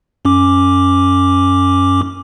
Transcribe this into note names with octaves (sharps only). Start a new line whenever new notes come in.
F#2 C#4 D6